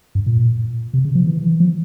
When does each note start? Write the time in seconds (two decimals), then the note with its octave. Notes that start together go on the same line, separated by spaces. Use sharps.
0.15 G2
0.26 A#2
0.94 C3
1.05 C#3
1.15 F3
1.27 E3
1.60 F3